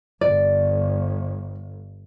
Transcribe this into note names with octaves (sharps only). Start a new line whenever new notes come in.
G1 D5